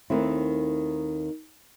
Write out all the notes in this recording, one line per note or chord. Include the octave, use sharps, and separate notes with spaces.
D#2 D#3 A3 C4 E4